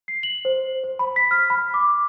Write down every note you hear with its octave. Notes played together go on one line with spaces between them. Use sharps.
C7
F#7
C5
C5
B5
B6
F6
B5
D6